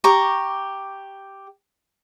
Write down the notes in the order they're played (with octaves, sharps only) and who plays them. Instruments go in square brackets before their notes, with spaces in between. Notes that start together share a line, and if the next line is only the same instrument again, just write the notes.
[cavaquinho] G4 A#5 C#6 D6